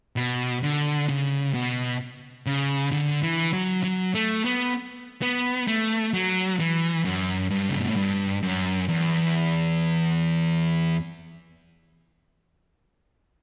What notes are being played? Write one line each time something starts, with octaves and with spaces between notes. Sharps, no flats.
B2
D3
C#3
B2
C#3
D3
E3
F#3
F#3
A3
B3
B3
A3
F#3
E3
F#2
G2
C#3
B2
A2
G2
F#2
E2